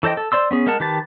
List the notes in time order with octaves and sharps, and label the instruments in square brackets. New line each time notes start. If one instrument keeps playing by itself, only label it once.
[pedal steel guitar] E3 A4 C5 D#5 G5
A4
C5 D5 C6 E6
B3 C#4 G#4
G#3 A#4 F#5 A5
D#3 G4 B4 A5